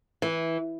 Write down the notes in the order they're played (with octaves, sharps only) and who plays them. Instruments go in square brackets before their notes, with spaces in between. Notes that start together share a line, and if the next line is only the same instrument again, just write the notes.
[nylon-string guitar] E3